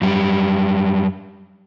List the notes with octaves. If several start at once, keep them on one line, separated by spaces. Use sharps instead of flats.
F#2 G3